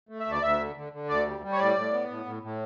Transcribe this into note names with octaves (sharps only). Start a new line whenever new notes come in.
A3
E5
D2
D5
D2 E5
D3
D3
D3
D2 D5
G3
G3
C#5
A2 D5
A2
B3
A2
A2
A2